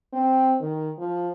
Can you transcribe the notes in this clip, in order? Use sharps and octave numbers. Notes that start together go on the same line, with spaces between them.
C4
D#3
F3